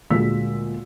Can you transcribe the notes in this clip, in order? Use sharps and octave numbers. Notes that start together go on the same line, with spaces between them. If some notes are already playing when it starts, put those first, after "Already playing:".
D2 A#2 G#3 F4 E6 B6